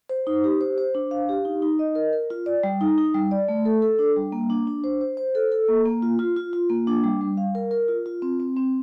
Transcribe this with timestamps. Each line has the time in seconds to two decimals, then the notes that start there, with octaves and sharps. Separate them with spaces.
0.09 C5
0.27 D#4
0.44 G4
0.61 C5
0.78 C5
0.95 D4
1.11 F5
1.29 G4
1.45 D#4
1.62 D#4
1.79 D#5
1.95 A#4
2.13 A#4
2.30 F4
2.46 D5
2.63 G3
2.81 D#4
2.98 D#4
3.14 G3
3.31 D5
3.48 A3
3.65 A4
3.82 A4
3.99 D4
4.16 G3
4.32 A#3
4.50 D4
4.67 D4
4.84 C5
5.01 C5
5.17 C5
5.35 A4
5.52 A4
5.69 A#3
5.85 A#3
6.02 F4
6.19 F4
6.36 F4
6.53 F4
6.69 A#3
6.87 D4
7.04 G3
7.21 G3
7.37 F5
7.55 A#4
7.71 A#4
7.88 F4
8.06 F4
8.22 C4
8.40 C4
8.56 C4